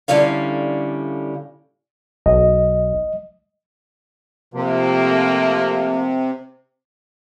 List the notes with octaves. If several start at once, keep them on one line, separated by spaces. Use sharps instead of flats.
A2 D3 G3 G#3 C#4 F5
B1 D#5
C3 F3 A3 A#3